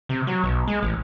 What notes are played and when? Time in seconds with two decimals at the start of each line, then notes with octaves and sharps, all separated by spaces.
0.09 C3
0.27 F#3
0.44 B1
0.67 G#3
0.83 A1